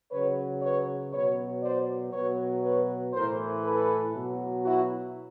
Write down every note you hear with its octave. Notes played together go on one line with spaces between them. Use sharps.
C#3 F#3 B4 C#5
B4 C#5
B2 F#3 B4 C#5
C5 D5
B2 F#3 B4 C#5
B4 C#5
A2 E3 A#4 C5
A4 B4
B2 F#3
E4 F#4